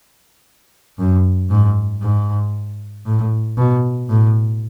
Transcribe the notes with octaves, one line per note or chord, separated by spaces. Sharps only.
F#2
G#2
G#2
A2
B2
A2